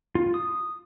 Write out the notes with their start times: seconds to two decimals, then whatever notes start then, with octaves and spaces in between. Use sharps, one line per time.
0.15 F4
0.34 D#6